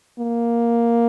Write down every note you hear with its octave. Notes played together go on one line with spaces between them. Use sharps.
A#3